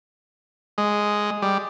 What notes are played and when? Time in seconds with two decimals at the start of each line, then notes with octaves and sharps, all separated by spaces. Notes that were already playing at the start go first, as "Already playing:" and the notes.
0.78 G#3
1.42 G3